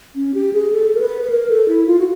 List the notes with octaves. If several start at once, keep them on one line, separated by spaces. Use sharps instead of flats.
C#4
G4
G#4
A4
A#4
B4
B4
A#4
A4
E4
F4
F#4